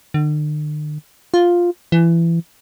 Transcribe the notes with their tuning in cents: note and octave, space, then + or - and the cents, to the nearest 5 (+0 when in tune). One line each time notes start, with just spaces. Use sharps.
D3 +45
F4 +5
E3 +25